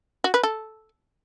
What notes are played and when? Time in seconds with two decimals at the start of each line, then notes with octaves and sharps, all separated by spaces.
0.24 F#4
0.34 B4
0.43 A4